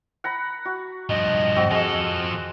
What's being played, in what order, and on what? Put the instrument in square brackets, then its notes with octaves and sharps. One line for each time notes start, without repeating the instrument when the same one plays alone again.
[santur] F#5 A#5 B5
F#4
[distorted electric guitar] G2 F3 [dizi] D#5
[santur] C4 F#4
[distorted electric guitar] F3 A4 [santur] G#3